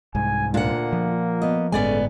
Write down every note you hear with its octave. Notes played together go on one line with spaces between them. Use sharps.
C2 G#2 G#5
D2 A#2 A#3 D4 F4 F#5
F3
B3 D#5
G1 A2 G#3 A3 B3 C#4 D5 G#5